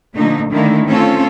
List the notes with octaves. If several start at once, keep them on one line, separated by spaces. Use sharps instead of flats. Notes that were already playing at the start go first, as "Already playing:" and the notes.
A#2 D3 F3 A3 D#4
D3 D#3 A3 A#3 D4 E4
A3 C4 C#4 F4 A4